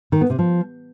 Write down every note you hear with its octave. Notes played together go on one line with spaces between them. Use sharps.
D#3
B3
C3
F3